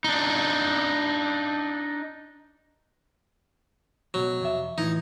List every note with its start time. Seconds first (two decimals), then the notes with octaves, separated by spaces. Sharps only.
0.04 D4 D#4
4.14 C#2 B2 F#3
4.41 F2 C3 E5
4.78 A2 E3 F3 D#4